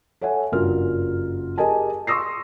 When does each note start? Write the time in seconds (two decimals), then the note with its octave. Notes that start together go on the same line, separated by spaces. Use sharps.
0.21 A4 C#5 E5 F#5 G#5
0.52 F#1 G2 F4 F#4 A#4 F6
1.58 G4 G#4 A#4 D#5 G#5 A5
2.07 C6 C#6 D#6 E6 A#6 C7